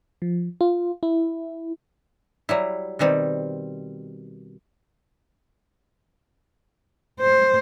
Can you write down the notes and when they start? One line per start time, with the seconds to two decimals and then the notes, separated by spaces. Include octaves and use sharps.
0.22 F3
0.61 F4
1.03 E4
2.49 F#3 G3 E4
2.99 B2 D#3 G3 C4
7.20 C5